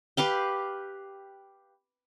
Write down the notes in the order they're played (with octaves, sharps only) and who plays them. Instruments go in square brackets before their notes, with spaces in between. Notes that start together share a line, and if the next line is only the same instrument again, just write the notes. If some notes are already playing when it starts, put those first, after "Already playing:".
[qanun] G4 B4 F5 G5